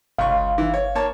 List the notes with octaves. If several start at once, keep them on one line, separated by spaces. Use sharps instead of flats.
G1 C#2 F5 C#6
E3
C#5
A#3 C#5 A5